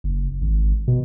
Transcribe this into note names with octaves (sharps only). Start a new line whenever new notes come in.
F#1
G#1
B2